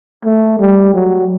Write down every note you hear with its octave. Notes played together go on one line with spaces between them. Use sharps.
A3
G3
F#3